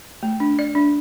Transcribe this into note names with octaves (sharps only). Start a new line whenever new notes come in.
A3
D4
D5
D4